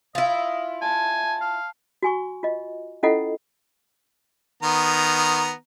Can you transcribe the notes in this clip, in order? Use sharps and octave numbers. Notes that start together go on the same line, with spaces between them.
E4 F4 D#5
G#5 A5
F5
F#4 G#5 C#6
F4 D#5
C#4 E4 F4 A4 D#5 F#5
D#3 B3 A#5